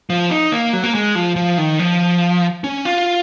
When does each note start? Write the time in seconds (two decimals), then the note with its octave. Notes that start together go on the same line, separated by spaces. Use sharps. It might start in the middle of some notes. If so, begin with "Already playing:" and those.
0.10 F3
0.31 D#4
0.52 A#3
0.73 F#3
0.83 A#3
0.95 G#3
1.15 F3
1.36 F3
1.58 D#3
1.79 F3
2.64 C#4
2.85 F4